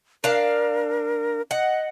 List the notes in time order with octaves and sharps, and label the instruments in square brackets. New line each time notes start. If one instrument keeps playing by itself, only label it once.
[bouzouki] D4 F5 [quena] A#4
[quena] D#5 [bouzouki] F#5